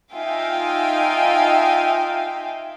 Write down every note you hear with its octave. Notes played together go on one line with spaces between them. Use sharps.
D#4 F4 E5 F5 G5 G#5